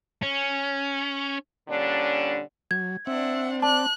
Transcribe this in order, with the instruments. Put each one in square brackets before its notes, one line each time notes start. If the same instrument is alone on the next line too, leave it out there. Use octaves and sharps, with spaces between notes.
[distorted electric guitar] C#4
[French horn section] A#2 D3 G3 C#4 D4
[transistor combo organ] F#3 [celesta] G#6
[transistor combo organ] C4 [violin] D4 F#5 [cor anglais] E5
[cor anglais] D5 [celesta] A5 [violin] F#6